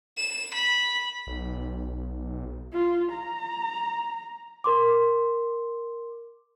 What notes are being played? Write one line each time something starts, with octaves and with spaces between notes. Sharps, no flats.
E7
B5
B1
F4
A#5
A#4 C6 D6